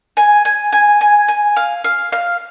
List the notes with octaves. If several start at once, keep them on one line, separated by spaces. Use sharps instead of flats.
G#5
G#5
G#5
G#5
G#5
F5
F5
F5